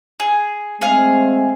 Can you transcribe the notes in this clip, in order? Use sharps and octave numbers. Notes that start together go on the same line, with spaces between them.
G#4
G#3 A3 C4 G#4 F5